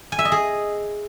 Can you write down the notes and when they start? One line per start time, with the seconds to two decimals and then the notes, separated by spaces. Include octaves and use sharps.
0.12 G#5
0.19 E5
0.25 D#5
0.32 G#4